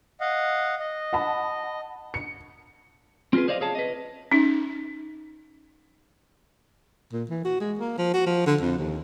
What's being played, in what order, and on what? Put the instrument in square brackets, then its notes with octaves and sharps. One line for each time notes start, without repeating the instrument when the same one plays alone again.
[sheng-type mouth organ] D#5 F5 F#5
D#5
[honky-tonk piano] F#5 A5 B5
C#7
[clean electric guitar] C4 F4 F#4 G#4 B4
G#4 C5 D5 D#5 F5
G#4 C#5 F5 A5
B4 D#5
[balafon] C#4 D#4
[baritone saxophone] A#2
E3
F#4
G#3
A#3
F3
F#4
F3
D3
F2
D#2